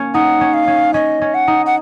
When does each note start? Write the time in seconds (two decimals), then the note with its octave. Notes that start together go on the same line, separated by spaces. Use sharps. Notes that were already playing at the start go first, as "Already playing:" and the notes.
Already playing: A#3 C#4
0.14 D#4 F#5
0.41 C#4
0.54 F5
0.68 C#4
0.94 C#4 D#5
1.22 C#4
1.34 F#5
1.48 D#4
1.66 F#5